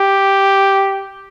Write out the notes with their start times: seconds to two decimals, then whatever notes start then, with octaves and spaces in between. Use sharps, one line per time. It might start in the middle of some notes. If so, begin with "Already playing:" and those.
Already playing: G4